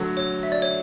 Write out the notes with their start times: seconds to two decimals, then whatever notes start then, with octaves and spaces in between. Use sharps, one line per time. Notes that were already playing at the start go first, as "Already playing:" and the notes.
Already playing: D3 F#3 A3
0.17 C#5
0.43 E5
0.52 D5
0.62 C#5